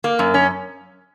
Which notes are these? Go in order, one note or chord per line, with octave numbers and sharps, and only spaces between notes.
A#3
F#2
C#4